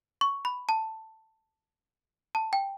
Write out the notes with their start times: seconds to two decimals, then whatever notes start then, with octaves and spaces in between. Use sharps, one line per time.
0.21 C#6
0.45 B5
0.69 A5
2.35 A5
2.53 G5